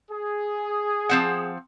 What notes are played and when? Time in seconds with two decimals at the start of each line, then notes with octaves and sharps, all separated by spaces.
0.12 G#4
1.09 F3 C4 F#5